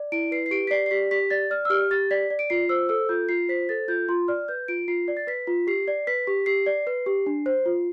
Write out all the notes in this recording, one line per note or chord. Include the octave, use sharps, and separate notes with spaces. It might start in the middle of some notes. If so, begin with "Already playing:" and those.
Already playing: D5
E4 D7
B4 C7
C7
G4 D7
B6
D5 C7
C7
G4 B6
G4 B6
D5 A6
D5 F6
E6
G4 F6
G4 A6
D5 B6
D5
D7
F4 C7
C5 E6
A4 E6
F4 G6
F4 C7
C5 B6
A4 A6
F4 G6
F4 C6
D5 F6
B4 G6
F4 D7
F4 C7
D5
A6
B4 B6
F4
G4 C7
D5
B4 B6
G4
G4 C7
D5
B4
G4
D4
C5
F4